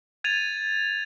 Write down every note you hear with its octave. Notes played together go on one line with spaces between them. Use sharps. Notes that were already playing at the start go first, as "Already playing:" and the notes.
G#6 A6 D#7 F7